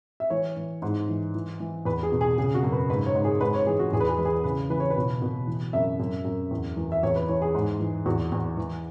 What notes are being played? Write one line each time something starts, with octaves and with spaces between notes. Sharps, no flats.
E5
E3 C#5
E3
G#2
E3
E3
E3
E2 B4
G#4
B2
G#4
C#3 G#4
F#4
F#2
B4
G#2 B4
C#5
G#2
G#4
G#2 B4
C#5
E3 G#4
F#4
E2 G#4
B4
G#4
E3 B4
G#4
C#3 B4
E3 B4
C#5
B4
B2
B2
E3
F#2 E5
F#2
F#2
E2
E3
E5
E2 C#5
B4
E3 C#5
G#4
G#2
E3
E2 F#4
E2
E3